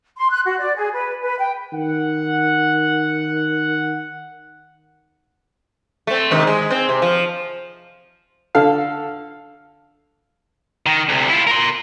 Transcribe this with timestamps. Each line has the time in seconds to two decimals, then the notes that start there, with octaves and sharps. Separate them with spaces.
0.17 C6
0.30 F#6
0.45 F#4
0.58 D5
0.76 G#4
0.92 B4
1.23 B4
1.40 G5
1.73 D#3 F#5
6.07 A3 C4
6.31 G#2 C3 D#3
6.47 G#3
6.71 C4
6.89 C3
7.02 F3
8.55 D3 A4 F5
10.86 D#3
11.09 D2 C3
11.29 E4 F4
11.47 A#4 C6